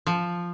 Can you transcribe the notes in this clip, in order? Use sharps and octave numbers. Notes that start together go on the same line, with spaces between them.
F3